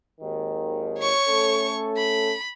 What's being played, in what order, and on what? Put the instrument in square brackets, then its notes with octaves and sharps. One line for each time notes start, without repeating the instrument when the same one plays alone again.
[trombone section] G#1 D#2 D#3
[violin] C#5 C#6
[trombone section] A3 C#4 A4
[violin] B5